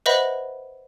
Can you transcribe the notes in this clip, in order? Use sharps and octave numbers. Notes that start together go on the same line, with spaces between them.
B4 C5 D#5 E5 F#5 B5